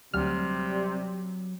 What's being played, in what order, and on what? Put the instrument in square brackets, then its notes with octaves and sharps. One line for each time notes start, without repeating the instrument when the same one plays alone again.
[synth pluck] D2 F6 [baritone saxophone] C3 [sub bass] F#3 [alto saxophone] G3